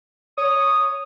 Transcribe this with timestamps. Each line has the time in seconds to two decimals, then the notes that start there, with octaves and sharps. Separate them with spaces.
0.38 C#5 D#6